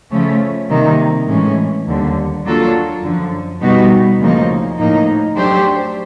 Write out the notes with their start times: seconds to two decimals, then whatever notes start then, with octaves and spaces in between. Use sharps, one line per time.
0.10 C#3 F3 A3 C#4
0.69 C3 D#3 G3 A#3 D#4
1.27 A2 E3 G#3 C#4
1.86 D#2 D3 G3
2.45 F#3 A#3 D4 F4 A4
3.03 F#2 D3 F3
3.61 B2 G3 B3 D#4 F#4
4.20 D2 C#3 F3 A#3 D#4
4.78 A2 F3 A#3 D#4
5.36 F#3 A3 D4 G4 C5